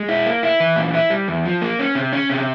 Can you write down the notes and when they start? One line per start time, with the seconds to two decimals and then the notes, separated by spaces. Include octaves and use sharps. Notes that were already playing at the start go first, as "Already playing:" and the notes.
Already playing: G#3
0.09 E4
0.26 A#3
0.43 E4
0.60 E3
0.76 A#2
0.94 E4
1.10 G3
1.28 E2
1.45 F3
1.62 A#3
1.79 C#4
1.95 C3
2.13 C#4
2.30 C3